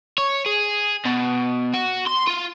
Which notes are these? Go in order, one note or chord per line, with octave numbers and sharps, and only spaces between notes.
C#5
G#4
B2
F#4
C6
F4